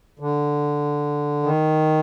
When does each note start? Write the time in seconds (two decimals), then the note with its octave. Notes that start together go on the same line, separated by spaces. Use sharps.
0.19 D3
1.43 D#3